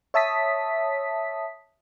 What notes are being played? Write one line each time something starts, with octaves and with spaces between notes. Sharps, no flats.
C#5 E5 A5 D#6 B6